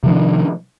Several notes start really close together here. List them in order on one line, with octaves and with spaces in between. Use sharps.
C3 F3 D#3 D4